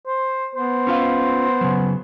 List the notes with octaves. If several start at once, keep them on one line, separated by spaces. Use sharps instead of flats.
C5
B3 C5
C#4 F4 F5
C#3 F#3